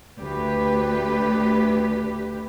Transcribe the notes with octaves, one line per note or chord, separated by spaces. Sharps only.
D2 G4 B4